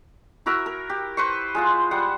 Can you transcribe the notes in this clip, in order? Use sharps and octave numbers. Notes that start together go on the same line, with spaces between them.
E4 F#4 A#4 E5
A#4
G4
B4 C5 C#6
G#3 F4 F#5
G3 C5 F#5